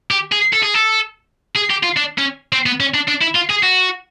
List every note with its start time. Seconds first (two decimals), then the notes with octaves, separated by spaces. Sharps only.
0.11 G4
0.32 G#4
0.53 A4
0.63 G#4
0.74 A4
1.56 G#4
1.70 G4
1.83 F4
1.97 D4
2.18 C#4
2.53 C4
2.66 B3
2.80 C#4
2.94 D4
3.08 D4
3.22 E4
3.36 F4
3.50 G#4
3.63 F#4